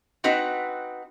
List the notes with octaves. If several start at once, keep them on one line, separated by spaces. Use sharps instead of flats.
C4 D#4 F#4 B4